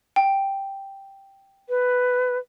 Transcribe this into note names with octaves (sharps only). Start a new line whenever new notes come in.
G5
B4